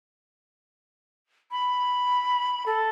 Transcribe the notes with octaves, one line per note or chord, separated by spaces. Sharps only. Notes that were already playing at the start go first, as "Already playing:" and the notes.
B5
A4